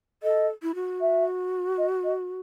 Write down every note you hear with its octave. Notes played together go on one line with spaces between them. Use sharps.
A4 D#5
E4
F#4
E5
D#5
D#5